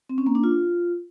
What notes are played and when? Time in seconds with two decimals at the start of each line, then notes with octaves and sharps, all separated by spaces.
0.09 C4
0.18 C#4
0.26 A#3
0.35 D4
0.44 F4